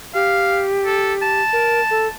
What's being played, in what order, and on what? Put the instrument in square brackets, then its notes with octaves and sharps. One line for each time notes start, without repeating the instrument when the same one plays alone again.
[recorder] G4 [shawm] F5
[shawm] A4
A5
[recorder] A#4
A4